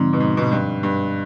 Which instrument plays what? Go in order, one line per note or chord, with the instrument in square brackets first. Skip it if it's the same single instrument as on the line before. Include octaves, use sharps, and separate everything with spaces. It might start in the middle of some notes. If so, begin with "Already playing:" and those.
Already playing: [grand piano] G#2 [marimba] D3 F3 C4
[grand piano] B2
G#2
B2
G#2
G2
G2